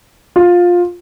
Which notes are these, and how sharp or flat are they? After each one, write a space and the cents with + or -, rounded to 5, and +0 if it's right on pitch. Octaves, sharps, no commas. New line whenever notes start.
F4 +15